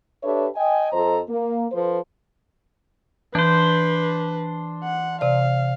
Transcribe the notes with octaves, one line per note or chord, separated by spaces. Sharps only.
D4 G4 A4 B4 C#5 E5
D#5 G5 G#5
F2 F3 A4 C5 D#5 A#5
A#3
F3 A4 B4 C5
E3 D4 B4 C5
F#5
C3 D5 F5